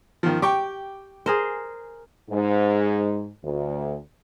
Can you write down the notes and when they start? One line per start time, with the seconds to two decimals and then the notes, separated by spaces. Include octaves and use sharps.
0.23 D#3 F3
0.42 G4 G5 C#6 D6
1.26 G#4 A#4 C5
2.29 G#2
3.43 D2